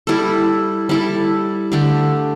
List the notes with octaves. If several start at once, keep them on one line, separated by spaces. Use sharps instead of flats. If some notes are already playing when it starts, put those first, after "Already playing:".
G3 E4 A4
G3 E4 A4
D3 A3 D4 G4